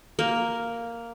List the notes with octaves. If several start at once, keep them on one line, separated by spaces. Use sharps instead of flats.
A#3